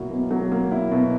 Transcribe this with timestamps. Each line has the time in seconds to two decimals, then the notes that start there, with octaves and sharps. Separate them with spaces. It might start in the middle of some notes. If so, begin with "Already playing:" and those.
Already playing: B2 F#3 A#3 E4
0.10 B2
0.31 F#3
0.52 A#3
0.72 E4
0.92 B2